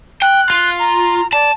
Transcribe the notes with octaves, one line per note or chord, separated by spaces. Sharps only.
G5 F#6
F4
A#5
D5 A5